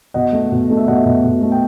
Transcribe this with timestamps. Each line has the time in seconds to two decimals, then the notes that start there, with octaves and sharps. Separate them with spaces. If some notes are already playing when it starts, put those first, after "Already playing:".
0.14 B2 D#5 F#5
0.33 A3
0.52 B2
0.70 A3
0.77 E5
0.88 B2 D#5 F#5
1.06 B2
1.25 B2
1.42 A3
1.52 G5